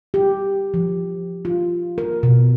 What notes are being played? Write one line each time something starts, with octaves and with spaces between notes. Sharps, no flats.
G4
F3
F4
A#4
B2